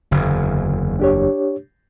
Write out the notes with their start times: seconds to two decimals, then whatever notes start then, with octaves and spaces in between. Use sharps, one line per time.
0.11 F#1 E2 D3
1.00 D4 G4 C#5